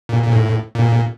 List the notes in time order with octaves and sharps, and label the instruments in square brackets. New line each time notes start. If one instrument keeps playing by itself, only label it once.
[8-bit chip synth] A#2
A#2
A2
A#2